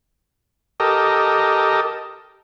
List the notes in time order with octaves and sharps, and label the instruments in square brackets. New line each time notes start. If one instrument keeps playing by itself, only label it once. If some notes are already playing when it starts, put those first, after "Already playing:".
[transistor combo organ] G4 A4 A#4 D#5